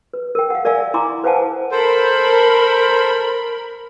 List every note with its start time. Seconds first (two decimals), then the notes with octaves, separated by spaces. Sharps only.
0.13 B4
0.35 A#4 G5
0.50 F5 F#5
0.65 A#4 D5 E5 F5 G#5
0.94 E4 G#5 A#5 C6 D6
1.24 B4 C5 F5 F#5 G#5 A5
1.72 A4 A#4 C5 B5